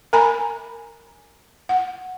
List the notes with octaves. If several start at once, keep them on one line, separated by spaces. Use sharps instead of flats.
A#4 G#5 A#5 B5
F#5